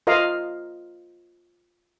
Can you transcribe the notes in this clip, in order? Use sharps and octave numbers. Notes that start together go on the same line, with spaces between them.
F4 A#4 D#5 F5